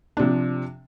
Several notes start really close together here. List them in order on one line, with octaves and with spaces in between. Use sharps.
D4 C3 F3